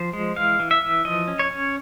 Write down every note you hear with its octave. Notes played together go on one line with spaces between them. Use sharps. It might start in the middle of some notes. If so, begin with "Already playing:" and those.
Already playing: F3 C5
G#3
E3 F5
E3
E5
E3
F3 D#5
C#4
C#5
C#4